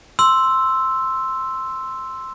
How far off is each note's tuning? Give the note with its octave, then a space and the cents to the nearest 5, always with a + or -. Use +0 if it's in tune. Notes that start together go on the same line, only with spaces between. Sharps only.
C6 +0 E6 +0